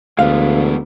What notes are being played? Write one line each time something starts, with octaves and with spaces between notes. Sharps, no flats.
D2 G#3 B3 F5